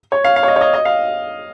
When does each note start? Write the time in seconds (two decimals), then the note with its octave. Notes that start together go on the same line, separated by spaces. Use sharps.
0.12 C#5
0.24 F5
0.36 F5
0.43 C#5
0.48 D#5
0.56 C#5
0.61 D#5
0.73 D#5
0.85 F5